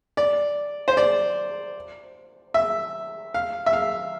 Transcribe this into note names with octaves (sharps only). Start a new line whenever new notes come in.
D5
C5
D5
E5
F5
E5
F5